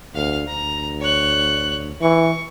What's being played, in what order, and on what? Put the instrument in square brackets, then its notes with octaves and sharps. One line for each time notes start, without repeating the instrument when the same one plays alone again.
[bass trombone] D2 [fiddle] F5
[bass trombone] D2 [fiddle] A#5
[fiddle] C#5 F#6
[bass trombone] E3 [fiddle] C#6